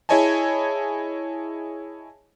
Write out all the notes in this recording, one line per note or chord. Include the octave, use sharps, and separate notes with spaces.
E4 G#4 C#5 D#5 G#5 A5